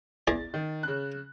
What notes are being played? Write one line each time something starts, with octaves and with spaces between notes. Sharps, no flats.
E2 G#4 D5 A6
D#3
C#3 F#6